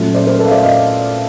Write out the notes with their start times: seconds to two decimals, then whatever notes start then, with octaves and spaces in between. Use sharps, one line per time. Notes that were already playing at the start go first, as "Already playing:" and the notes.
Already playing: A#2 F#3 A3 C#4
0.14 C5 D5
0.26 A#4 C5
0.39 A4 B4
0.46 F5
0.51 D5 E5
0.63 D#5 F5